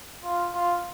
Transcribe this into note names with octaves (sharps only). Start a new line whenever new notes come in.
F4
F4